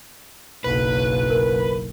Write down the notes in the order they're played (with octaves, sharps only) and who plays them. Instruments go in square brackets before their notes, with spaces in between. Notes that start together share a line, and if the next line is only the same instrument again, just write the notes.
[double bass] F#1 B1 [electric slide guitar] B4
[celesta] A#4